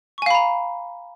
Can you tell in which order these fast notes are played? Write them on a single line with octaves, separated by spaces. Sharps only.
C#6 G#5 F5 B5 A#5